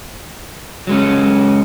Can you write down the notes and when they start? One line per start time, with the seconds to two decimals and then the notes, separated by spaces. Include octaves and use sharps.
0.87 F#3 G#3 C#4